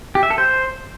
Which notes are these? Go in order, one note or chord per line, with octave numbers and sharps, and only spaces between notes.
G4
E5
A4
C5